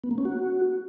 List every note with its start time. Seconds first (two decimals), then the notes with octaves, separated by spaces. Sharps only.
0.04 B3
0.11 A#3
0.18 C#4
0.25 F#4